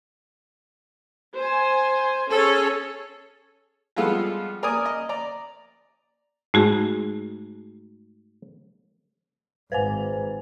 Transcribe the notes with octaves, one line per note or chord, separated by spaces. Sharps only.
C5 G#5
C#4 G#4 A4 C#5
F3 G3 G#3 B3 F4 A4
A#4 D5 G#5 D#6
D#5
D5 A#5
G#2 A3 F#4 G#4
G#1 B4 C5 G#5